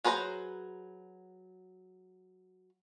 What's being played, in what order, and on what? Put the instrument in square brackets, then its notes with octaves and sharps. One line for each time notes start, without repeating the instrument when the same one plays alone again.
[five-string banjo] F#3 G#4 B4 C5 A#5